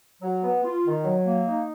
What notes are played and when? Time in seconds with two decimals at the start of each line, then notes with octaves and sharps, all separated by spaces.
0.21 F#3
0.42 B3
0.63 F4
0.84 D#3
1.04 F#3
1.25 A#3
1.46 D#4